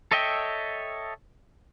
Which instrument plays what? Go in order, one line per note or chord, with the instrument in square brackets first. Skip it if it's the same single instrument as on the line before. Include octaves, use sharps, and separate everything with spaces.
[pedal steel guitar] A4 C#5 D#5 E5 G5